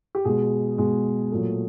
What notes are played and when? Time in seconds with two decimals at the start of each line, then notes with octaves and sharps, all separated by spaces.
0.15 G4
0.25 B2 G#3 G#4
0.78 B2 G#3
1.31 A#2 F#3 A3